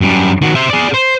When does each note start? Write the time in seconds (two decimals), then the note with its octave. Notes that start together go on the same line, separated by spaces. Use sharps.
0.01 F#2 G3
0.41 D#3 F#4
0.55 C5 E5
0.70 G#4 D5
0.94 C5